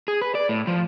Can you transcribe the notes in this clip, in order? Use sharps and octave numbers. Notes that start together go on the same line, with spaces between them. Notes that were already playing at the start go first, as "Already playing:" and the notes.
G#4
B4
D5
A2
F3